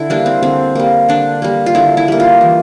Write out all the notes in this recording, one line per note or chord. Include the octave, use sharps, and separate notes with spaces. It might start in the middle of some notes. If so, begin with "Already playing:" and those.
Already playing: D3 E4
G3 A#3 D4
C4
D3 C4
G3 A#3
D3 D4
G3 A#3
F4
D3 E4
E4
G3 A#3
F4
E3